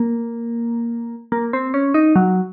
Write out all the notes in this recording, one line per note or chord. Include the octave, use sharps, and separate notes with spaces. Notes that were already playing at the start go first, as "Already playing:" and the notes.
Already playing: A#3
A#3
C4
C#4
D#4
F#3